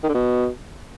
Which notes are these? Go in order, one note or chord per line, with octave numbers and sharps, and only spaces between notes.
D#3
D3
B2